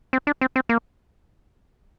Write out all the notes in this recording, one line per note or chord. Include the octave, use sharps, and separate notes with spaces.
C4
D4
C4
C4
A#3